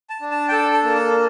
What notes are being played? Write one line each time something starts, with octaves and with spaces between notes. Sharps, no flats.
A5
D4
A5
G5
A4 A5
A5
A#3
A5